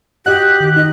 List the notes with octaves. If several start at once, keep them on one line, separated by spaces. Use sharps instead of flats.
F#4 G4 D#5 F#5 F#6
D#3
D#4 D#5